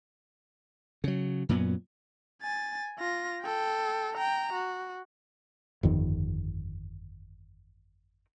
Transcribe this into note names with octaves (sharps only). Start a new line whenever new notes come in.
C#3 F#3
F#2 A#2 F#3 B3
G#5 A6
F4 A#6
A4 G5
G5 A#5
F#4
G1 F2 D#3